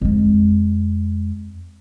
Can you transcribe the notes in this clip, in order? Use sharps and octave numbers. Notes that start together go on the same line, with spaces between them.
F2 G#3